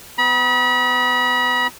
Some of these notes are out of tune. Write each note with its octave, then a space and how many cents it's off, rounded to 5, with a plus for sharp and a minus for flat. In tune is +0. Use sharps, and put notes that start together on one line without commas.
B3 +40 B5 -35